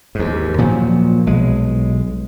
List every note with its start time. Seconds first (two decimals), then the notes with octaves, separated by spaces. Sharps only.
0.15 D#2 G#2
0.58 A#2 F3 F#3
1.26 B1 G#3